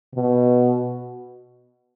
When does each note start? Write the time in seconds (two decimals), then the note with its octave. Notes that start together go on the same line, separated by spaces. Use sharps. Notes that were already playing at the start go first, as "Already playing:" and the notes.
0.15 B2